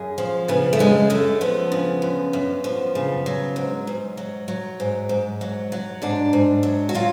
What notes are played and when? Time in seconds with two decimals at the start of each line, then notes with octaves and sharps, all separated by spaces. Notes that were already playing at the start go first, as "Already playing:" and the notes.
Already playing: F#2 G#4
0.18 F3
0.48 C#3 B3
0.73 A3
0.79 F#2 G#3
1.10 F#2 A3
1.41 F3 B3
1.72 C#3
2.02 F#2
2.33 F#2
2.64 F3
2.95 C#3
3.26 F#3
3.56 G#2
3.87 G#2
4.17 F#3
4.48 F#3
4.80 G#2
5.09 G#2
5.41 F#3
5.72 F#3
6.02 G#2 D4
6.33 G#2
6.63 F#3
6.89 F#4
6.94 F#3 F4